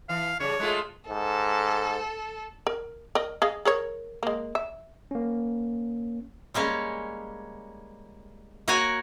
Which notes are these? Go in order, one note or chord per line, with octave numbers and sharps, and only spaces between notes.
E3 F5
C#3 G3 C#5
G#3 A3 F4
G#2 A4
A#4
A#4 D#5
G#4 D#5 F5
G#4 A#4 C#5
G#3 A#3
E5
A#3 C#4
G3 G#3 A#3 C#4
A#3 F#4 A#4 C#5 F#5 G#5